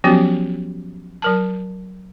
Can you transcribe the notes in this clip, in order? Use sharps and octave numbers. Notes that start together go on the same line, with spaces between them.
F3 F#3 B3 C#4 F#4 G4
F#3 A#4 A5